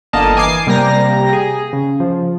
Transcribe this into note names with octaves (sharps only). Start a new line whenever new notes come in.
G1 D3 A#3 D#5 A5 F6
E3 G#5 D6 C7
C3 G3 A#3 G5 A#5 A#6
G#4
C#3
F3